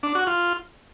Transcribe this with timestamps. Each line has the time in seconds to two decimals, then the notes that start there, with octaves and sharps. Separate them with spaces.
0.03 D4
0.15 F#4
0.27 F4